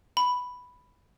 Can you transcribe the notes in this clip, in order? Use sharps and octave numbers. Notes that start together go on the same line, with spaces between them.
B5